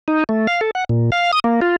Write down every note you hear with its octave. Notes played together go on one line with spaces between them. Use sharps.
D#4
A3
F5
A4
F#5
A#2
F5
D#6
A#3
F4